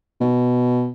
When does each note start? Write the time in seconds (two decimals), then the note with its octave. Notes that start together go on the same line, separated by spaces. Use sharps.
0.21 B2